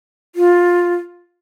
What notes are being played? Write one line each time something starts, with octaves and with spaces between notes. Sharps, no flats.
F4